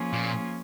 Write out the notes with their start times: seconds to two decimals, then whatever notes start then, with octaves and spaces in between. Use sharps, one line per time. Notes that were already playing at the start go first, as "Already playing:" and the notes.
Already playing: F3 A#3 C#4 F4 G#4
0.13 A#2